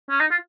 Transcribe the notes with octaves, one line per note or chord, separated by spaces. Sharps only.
C#4
D#4
F4